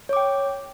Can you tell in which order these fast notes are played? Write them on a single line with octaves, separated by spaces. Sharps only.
C#5 D6 G5